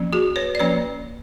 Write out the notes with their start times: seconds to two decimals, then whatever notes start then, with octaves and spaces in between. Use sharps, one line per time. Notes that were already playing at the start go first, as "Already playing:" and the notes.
Already playing: F3 A#3 C#4
0.13 F#4 G#4
0.36 B4 C#5
0.55 D5
0.60 F3 A#3 C#4 B4 C#5